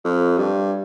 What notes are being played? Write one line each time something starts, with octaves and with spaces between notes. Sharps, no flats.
F2
G2